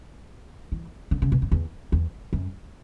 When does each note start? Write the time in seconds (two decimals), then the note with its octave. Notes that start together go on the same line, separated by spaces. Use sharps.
0.72 E3
1.11 D3
1.22 C#3
1.32 B2
1.42 F#2
1.52 E2
1.92 E2
2.33 F#2